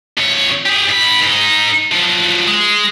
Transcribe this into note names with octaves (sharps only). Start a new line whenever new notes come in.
F2 C#5
G4 G#4
G#2 B5
G#2 D#4
F3 F#3
G#3